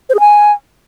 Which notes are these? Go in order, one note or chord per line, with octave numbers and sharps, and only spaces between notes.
C5
G#4
G#5